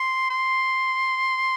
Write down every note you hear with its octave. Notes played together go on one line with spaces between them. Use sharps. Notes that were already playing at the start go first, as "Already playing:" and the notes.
Already playing: C6
C6